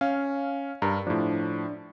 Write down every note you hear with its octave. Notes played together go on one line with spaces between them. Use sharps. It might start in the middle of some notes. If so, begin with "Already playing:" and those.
C#4 F5
G2 A#4
A2 F3 D4